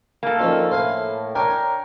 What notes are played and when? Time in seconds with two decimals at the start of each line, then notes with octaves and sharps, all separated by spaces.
0.23 A#3 A4
0.39 D2 D#3 F3 C#4 F4
0.71 A2 C5 F5 G#5
1.35 D4 A#4 C#5 G5 G#5 A#5